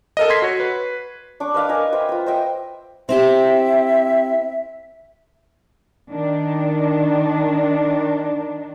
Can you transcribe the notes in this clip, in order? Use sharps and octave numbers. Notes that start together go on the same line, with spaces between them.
A4 A#4 D#5
C6 G#6 B6 C7
F#4 C#5
B4
D4 C#6 D6
B4 D#5 F5 D6
A#4 D#5 G#5
B4 C5 E5 G5
F4 B4
C5 D#5 E5 G5
C4 E4 G4 E5
D#3 D4